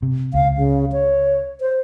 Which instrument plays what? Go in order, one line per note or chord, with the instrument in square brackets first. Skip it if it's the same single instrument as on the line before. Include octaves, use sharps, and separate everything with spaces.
[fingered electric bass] C3
[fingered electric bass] C#2 [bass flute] F5
[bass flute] C#3
C#5
C5